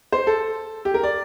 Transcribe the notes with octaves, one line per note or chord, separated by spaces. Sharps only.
C5
A4
G4
A#4
D5